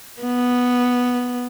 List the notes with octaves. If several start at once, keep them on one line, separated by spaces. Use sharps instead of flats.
B3